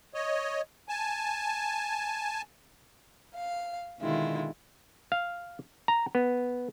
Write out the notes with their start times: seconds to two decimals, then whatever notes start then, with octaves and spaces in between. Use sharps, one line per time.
0.14 C#5 D#5
0.89 G#5 A5
3.35 F5
3.99 B2 D3 D#3 G#3 E4 F4
5.12 F5
5.88 A#5
6.15 B3